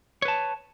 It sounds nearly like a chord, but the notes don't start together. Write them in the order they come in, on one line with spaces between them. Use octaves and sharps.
C#5 B4 A5